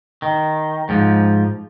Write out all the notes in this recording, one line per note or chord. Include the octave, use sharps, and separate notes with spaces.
D#3
G#2 F3